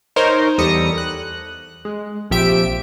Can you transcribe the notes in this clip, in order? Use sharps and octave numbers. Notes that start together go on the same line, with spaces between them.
D#4 A#4 C5 C#5
E2 G3 A4 D#6 A#6 C#7
F#6
G#3
A#1 C3 F3 G4 E5 D7